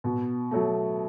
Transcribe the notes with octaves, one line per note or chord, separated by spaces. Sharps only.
B2
F#3 A3